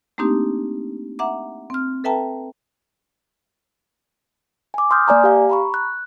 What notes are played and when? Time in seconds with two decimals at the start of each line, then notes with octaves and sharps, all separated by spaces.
0.18 A3 A#3 C4 D4 D#4 G4
1.19 E5 F#5 A#5 D6
1.70 C4 F6
2.04 A4 B4 E5 G5 A5 A#5
4.74 G#5 D6
4.91 C6 D#6 F6 G6
5.08 A#3 D5 G#5 A#5
5.24 G4 F5
5.49 A#5 B5 C#6
5.74 F#6